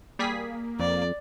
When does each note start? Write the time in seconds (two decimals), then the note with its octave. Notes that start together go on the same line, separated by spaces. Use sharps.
0.19 G3 A#3 G#4 B6
0.80 F2 D5